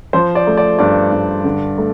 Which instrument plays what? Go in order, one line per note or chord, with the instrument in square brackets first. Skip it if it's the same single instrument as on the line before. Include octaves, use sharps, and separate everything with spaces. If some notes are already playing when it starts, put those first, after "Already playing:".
[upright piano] F3 C5
D5
A3
D5
G2 D5
G2
D3
A3